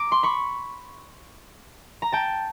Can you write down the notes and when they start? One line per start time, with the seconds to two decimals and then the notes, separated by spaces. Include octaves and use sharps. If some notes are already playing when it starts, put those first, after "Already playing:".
Already playing: A#5 D6
0.12 C6
0.23 B5 C#6
2.02 A#5
2.12 G5 A5